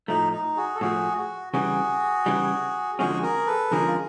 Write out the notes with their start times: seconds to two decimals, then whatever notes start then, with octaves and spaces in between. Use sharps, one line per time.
0.08 A2 F3 A3 D#4
0.33 D#4
0.57 F#4 G#4
0.75 A4
0.81 A2 F3 A3 F#4 G#4
1.18 F#4
1.53 C#3 E3 G3 F#4 G#4
2.26 C#3 E3 G3
2.99 F2 D3 F3 G#3 C#4 F#4 G#4
3.23 G#4 A#4
3.47 A4 B4
3.71 F2 D3 F3 G#3 C#4 G#4 A#4
3.87 F4